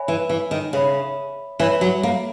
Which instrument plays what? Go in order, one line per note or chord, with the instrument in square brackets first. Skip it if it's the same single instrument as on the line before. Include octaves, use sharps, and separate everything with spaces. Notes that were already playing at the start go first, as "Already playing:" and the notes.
Already playing: [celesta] C#5 E5 G#5 B5
[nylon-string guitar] E3
E3
D#3
[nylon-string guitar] C#3 [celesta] C#5 E5 B5
[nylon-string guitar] E3 [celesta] C#5 E5 B5
[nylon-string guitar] F#3
A#3